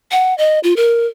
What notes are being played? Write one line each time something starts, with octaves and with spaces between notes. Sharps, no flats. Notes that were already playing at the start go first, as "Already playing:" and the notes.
F#5
D#5
F4
A#4